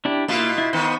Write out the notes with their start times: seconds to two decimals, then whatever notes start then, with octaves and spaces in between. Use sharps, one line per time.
0.05 D4 E4 G4
0.28 B2 A#3 E4 F4
0.58 E4
0.73 D#3 B3 C5